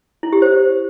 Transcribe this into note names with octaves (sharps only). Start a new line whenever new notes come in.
E4
G4
C5